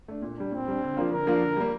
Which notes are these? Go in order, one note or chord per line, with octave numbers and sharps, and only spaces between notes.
A3 D4
A#2
G3 D4
A#2 C4
G3 D4
D3
F3 A#3 D4 F4
D3 A#4
F3 A#3 D4 F4
D3
G3 A#3